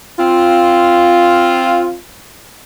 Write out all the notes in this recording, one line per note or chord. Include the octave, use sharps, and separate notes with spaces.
C4 F4